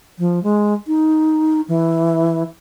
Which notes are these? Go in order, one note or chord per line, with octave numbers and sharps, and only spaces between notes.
F3
G#3
D#4
E3